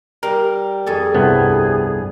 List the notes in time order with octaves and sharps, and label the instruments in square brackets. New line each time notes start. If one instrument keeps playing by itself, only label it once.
[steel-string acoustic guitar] G3 [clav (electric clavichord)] A#4
[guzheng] F2 A4 G#5 [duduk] G#4
[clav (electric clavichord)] C2 G2 B3